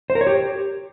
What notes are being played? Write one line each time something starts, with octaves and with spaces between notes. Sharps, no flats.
C5
A#4
C#5
G4